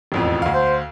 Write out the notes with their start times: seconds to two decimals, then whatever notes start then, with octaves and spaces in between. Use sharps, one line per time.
0.12 E1 A1 F2
0.42 D2 F5
0.54 C5